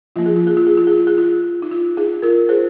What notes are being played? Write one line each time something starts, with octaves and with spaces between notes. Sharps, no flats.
F3 A#3 F4
G#4
F4
G#4
F4
G#4
F4
G#4
F4
G#4
F4
D#4
F4
D#4 G#4
F4 A#4
G#4 C5